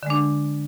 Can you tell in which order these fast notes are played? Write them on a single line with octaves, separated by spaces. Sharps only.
D3 G#3 D4